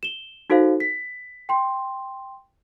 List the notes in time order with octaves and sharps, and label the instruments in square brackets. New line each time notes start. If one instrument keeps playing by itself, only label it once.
[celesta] E7 G7
D#4 F#4 A4 C5 F5
B6
G5 C6